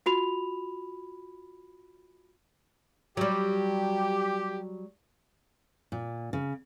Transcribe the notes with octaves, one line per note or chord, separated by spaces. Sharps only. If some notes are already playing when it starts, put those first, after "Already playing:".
F4 F#4 B5 F7
F#3 G3 G4
A#2
C#3